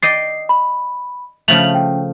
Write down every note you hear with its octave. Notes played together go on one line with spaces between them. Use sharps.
D5 D#5 G5 C7
B5
C#3 F3 A3 F7 F#7
G5